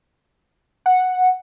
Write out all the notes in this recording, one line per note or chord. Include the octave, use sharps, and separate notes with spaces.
F#5